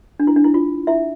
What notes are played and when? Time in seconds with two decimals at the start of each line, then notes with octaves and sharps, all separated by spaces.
0.19 D4
0.27 E4
0.36 D4
0.44 E4
0.54 F4
0.87 E4 E5